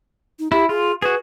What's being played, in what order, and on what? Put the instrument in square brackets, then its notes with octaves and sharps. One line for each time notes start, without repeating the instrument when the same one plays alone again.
[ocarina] D#4
[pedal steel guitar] E4 [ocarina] G4
[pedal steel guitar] F4 [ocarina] G#4
[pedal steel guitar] F#4 G#4 [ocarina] B4